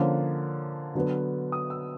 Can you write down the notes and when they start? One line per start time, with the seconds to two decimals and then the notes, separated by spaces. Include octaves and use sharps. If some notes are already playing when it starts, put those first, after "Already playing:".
Already playing: D3 F3 A#3 C#4
0.95 D3 F#3 B3
1.52 D#6
1.70 E6